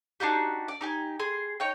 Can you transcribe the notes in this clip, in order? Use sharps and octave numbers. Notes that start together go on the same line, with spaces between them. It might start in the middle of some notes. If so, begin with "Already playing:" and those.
D4 D#4 F#4 G4
D5
D#4 G4 G#5
G#4 C6
D#4 C#5 G5